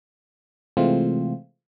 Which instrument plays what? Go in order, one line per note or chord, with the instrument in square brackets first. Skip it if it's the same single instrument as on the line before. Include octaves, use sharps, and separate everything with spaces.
[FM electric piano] C3 E3 G#3 A3 C4 F4